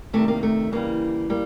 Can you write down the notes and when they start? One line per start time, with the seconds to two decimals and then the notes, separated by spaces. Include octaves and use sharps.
0.13 C3 D#3 G3 A3
0.28 A#3
0.43 A3
0.72 C#3 E3 G3 A#3
1.30 G3 A#3